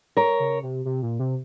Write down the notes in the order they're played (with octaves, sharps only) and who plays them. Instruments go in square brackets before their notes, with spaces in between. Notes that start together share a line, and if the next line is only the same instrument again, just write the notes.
[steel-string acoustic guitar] A#4 C#5
[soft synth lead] C#3
C3
C3
A#2
C3